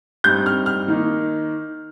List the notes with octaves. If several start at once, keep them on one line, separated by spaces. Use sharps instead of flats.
G2 G3 C4 D#4 G6
F6
F6
D#3 A#3 D#4